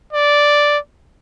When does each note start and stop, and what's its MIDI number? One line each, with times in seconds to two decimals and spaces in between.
0.13 0.78 74